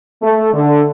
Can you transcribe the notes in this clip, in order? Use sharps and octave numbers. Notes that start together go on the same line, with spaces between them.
A3
D3